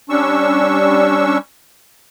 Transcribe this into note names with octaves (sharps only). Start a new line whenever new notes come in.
G3 C#4 D4 C#6 E6